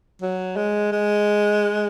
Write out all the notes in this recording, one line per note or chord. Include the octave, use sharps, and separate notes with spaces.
F#3
G#3
G#3